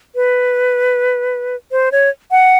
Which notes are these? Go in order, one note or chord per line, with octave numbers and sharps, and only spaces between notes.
B4
C5
C#5
F#5